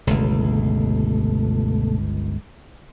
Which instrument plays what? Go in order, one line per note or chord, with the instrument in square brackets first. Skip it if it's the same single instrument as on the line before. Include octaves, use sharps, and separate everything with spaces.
[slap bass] G1 C#2 [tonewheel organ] B2 A3